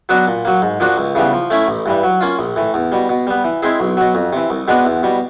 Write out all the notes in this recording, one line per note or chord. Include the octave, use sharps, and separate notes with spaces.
F#3 B3 D4 F#4
A#2
F#3 A#3
G#2
F3 A#3 D4 F#4
C#2
C#3 E3 G3 B3
F3
A3 C#4 E4
A1
G2 E3 G3
F#3
A#3 C#4 F4
A#1
A2 E3
E2
B2 G3
B2
G3 B3
E3
G#3 C4 E4 G#4
B1
B2 F#3
F2
C3 E3
C2
B2 G#3 B3 D4
E2
B2 G3